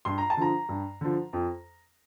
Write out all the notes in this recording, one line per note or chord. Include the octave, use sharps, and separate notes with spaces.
G2 C6
A#5
A5
D3 F3 A#5
G2
D3 F3
F2